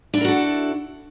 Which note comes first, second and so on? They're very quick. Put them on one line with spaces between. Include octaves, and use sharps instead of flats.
D4 E4 A#4 F#4 A4